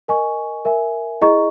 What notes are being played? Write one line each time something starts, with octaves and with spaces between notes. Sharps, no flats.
A#4 D#5 G#5 C#6
A#4 E5 G#5
E4 G#4 D#5 A#5 C#6